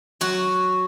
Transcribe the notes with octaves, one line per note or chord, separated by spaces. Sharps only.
F#3 F#4